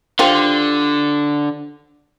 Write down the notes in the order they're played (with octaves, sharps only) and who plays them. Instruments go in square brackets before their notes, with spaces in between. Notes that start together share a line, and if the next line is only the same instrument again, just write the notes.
[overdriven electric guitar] D3 [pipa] F4 G4 C5